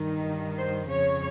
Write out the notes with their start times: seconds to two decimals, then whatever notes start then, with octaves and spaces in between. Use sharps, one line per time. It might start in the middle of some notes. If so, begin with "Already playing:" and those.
Already playing: G2 D#3
0.58 C5
0.91 F2 C#3 C#5